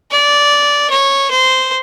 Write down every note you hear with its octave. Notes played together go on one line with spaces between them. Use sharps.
D5
C#5
C5